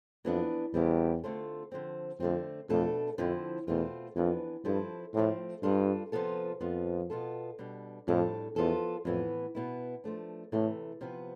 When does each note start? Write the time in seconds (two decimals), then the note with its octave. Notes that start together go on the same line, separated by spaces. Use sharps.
0.25 F2 E3 B3 D4
0.74 E2 G3 C4 E4 G4
1.24 D3 A3 C4 F4 A4
1.72 D3 F3 C4
2.20 F2 D3 A3 C4
2.70 F2 B2 A3 D4 A4
3.18 F2 D3 F3 C4 E4
3.67 E2 B2 A3 C4 F4
4.16 F2 E3 B3 D4
4.65 G2 F3 C4 E4 A4
5.14 A2 F3 A3 C4
5.63 G2 G3 D4 F4 A4
6.12 C3 F3 B3 F4 A4
6.61 F2 F3 B3 F4
7.10 B2 B3 F4 A4
7.59 B2 G3 D4
8.08 F2 A2 G3 D4 A4
8.56 E2 F3 B3 F4 A4
9.05 F2 A2 E3 B3
9.55 B2 B3 E4
10.04 F3 A3 D4
10.52 A2 C3 E3 A3
11.01 C3 F3 B3